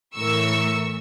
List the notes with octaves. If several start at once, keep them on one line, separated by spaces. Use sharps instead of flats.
A2 E3 A#4 C#6 E6